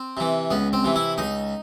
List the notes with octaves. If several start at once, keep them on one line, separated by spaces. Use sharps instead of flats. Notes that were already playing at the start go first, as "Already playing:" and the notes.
Already playing: C4
C3 E3
C#2 B3
C4
C3 E3
E4
C#2 D#4